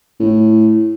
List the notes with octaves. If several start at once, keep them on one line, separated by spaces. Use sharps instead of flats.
A2